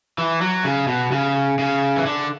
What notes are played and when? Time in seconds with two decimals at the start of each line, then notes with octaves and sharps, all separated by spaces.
0.18 E3
0.41 F#3
0.64 C#3
0.87 B2
1.12 C#3
1.59 C#3
1.96 E3
2.06 D3